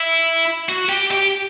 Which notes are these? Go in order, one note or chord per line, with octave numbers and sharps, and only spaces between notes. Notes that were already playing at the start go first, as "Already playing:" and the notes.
Already playing: E4
F#4
G4
G4